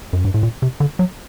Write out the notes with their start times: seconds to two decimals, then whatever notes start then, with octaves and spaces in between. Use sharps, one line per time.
0.13 F#2
0.25 G2
0.34 A2
0.43 A#2
0.62 C3
0.80 D3
0.99 F#3